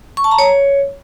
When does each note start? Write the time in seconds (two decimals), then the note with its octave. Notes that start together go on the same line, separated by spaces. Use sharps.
0.17 C#6
0.24 A5
0.31 A#5
0.39 C#5